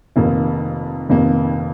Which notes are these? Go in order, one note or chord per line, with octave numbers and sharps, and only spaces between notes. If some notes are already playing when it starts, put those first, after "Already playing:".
F1 F2 D#3 A#3
F1 F2 D#3 A#3